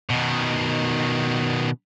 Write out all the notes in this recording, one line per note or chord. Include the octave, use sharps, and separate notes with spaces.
B2 D#3